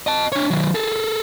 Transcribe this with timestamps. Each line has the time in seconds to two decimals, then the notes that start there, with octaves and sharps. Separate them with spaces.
0.07 D#5 A5
0.32 D4 C#5
0.51 D#3 F#3
0.75 G#4 A4